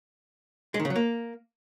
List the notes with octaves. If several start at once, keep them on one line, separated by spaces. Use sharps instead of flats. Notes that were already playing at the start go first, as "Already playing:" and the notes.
G#3
D#3
C#3
F#3
A#3